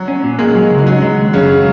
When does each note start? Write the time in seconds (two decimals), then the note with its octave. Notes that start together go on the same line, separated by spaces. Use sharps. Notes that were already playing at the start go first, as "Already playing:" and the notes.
Already playing: F#3 F#4
0.08 C#4
0.23 A#2
0.39 G#3 A#3 G#4
0.55 F#3
0.70 C#2
0.78 D#4
0.86 F#3 C#4 F#4
1.02 G#3
1.18 D#2
1.33 F#2 C#3 C#4
1.49 G#3